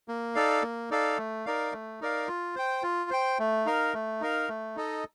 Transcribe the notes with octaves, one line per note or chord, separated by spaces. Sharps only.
A#3
D#4 A4 D5 F5
A#3
D#4 A4 D5 F5
A3
D#4 A#4 D5 F5
A3
D#4 A#4 D5 F5
F4
C5 G5
F4
C5 G5
A3
D#4 A#4 F5
A3
D#4 A#4 F5
A3
D#4 A4 D#5